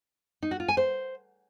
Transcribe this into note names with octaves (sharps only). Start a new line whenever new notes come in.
D#4
F#4
F4
G#5
C5